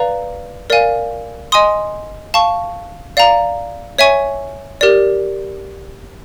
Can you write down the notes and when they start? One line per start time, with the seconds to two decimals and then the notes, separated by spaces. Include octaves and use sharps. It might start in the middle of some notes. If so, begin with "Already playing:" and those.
Already playing: B4 D5 F5 A#5
0.70 A#4 D5 F5 G#5
1.52 D#5 G#5 C6 D#6
2.34 F5 A5 C#6
3.17 D5 F5 A#5
3.99 C#5 E5 G#5 C#6
4.81 G4 A#4 D5